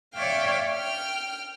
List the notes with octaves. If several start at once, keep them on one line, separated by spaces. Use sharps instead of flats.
C#5 D5 E5 F5 G5 F6
G5 F6